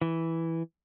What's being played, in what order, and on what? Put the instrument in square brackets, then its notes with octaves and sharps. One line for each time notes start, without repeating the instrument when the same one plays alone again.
[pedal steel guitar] E3